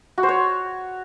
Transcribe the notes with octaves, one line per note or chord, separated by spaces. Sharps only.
F#4
C5
C#5